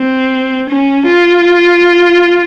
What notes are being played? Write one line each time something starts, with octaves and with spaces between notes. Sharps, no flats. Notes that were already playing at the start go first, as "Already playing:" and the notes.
Already playing: C4
C#4
F4